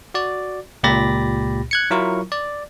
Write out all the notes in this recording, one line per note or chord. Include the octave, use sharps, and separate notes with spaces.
F#4 D5
C#2 A#2 G4 B5 A6 A#6
F#6 G#6 C#7
F#3 E4 F4 A#4 C#6
D5